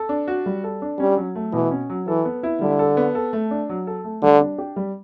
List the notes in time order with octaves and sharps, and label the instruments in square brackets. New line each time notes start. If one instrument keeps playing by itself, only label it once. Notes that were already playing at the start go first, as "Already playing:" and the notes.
Already playing: [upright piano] A4
D4
F#4
G3
A4
D4
[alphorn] G3 [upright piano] C#4
[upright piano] F#3
A3
[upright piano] B2 [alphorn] E3
[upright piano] C#4
F#3
[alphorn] E3 [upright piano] A4
[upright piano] B3
E4
[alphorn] D3 [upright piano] G3
[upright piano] A4
B3
A4
A3
D4
F#3
A4
A3
[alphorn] D3 [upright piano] G3
[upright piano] D4
G4
G3